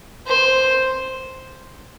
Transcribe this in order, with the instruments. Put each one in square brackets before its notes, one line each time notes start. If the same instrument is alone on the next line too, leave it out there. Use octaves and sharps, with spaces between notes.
[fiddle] C5